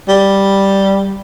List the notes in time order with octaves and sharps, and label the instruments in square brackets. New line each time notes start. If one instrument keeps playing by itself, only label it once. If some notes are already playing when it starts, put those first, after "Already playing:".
[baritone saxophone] G3